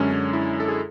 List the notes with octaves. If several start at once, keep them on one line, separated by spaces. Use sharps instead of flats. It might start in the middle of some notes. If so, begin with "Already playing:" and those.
Already playing: F#2 D3 G#3 C#4
C#4
E4
A4
G#4